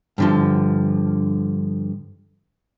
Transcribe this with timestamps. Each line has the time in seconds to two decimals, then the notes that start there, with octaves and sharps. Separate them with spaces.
0.18 G2 D3 F3